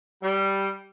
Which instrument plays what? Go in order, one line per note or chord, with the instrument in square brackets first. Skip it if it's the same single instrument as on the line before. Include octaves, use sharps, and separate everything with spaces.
[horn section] G3